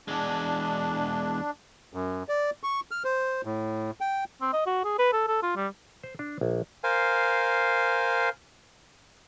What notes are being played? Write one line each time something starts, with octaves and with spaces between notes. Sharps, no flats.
E2 G#3 D4
F#2
D5
C#6
F6
C5
A2
G5
C4
D#5
F#4
G#4
B4
A4
A4
F4
G3
C5
D4
A#1
A#4 C5 F5 G#5